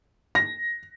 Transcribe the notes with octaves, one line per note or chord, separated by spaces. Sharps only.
A#6